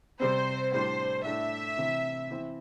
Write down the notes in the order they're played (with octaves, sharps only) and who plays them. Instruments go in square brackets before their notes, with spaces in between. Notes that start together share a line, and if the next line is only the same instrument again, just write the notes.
[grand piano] C3 G3 C4 [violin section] C5
[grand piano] A2 G3 D4 [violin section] C5
[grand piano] A2 A3 D4 [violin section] E5
[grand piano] C3 E3 C4
E3 C4 E4